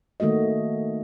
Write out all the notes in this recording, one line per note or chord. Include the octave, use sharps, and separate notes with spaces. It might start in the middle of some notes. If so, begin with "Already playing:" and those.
D#3 A3 A#3 F#4 D#5